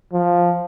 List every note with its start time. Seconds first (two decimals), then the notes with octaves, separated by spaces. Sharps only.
0.13 F3